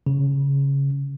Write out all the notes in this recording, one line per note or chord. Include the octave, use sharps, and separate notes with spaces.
C#3